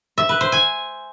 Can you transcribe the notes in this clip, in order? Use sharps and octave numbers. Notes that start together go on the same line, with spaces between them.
E5
B4
C5
G#5